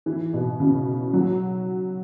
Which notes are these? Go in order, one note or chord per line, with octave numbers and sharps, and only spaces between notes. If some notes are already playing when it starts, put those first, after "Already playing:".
E3
B2
C#3
F#3